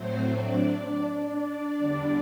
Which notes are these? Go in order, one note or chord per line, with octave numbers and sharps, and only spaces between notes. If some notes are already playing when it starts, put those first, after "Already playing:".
Already playing: A2 F#3 A3 C4 C5
D4 D5
E2 D3 G3